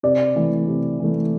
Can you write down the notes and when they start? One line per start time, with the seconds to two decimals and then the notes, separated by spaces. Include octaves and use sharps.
0.03 C3 D5
0.35 E3 A3
0.68 C3
1.00 E3 A3